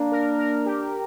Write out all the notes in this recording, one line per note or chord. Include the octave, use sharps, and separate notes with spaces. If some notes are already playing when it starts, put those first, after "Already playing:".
Already playing: A#3 D4
A#4
A#4
G4